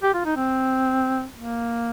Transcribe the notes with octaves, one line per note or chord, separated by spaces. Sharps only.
G4
F4
D#4
C4
A#3